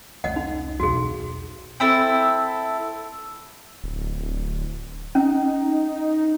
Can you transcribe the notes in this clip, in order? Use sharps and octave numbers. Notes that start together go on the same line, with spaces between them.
F1 C#2 D#5 F#5
D#4
B1 E2 F#4 G#4
C4 E4 A4
D1
C#4 D#4